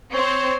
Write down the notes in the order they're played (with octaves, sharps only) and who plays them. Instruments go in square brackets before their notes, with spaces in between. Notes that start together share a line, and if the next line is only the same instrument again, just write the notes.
[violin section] C4 C5 [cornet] C#5